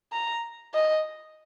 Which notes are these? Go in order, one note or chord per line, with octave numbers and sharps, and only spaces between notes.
A#5
D#5